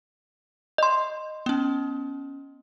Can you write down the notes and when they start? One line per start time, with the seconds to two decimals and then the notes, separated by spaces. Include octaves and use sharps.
0.78 D#5 C6
1.46 B3 C#4